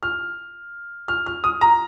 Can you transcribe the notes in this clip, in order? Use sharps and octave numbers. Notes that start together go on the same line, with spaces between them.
F6
F6
F6
D#6
A#5